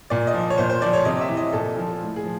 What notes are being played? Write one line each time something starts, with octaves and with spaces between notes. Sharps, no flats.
A#2 D5
D#5
F3
C#5
A#2 C5
C5
F3 D5
C#5
C3 D#5
E5
E3
D#5
A#2 A4
F3
A2
G#4
F3